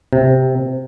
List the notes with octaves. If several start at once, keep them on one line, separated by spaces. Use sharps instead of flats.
C3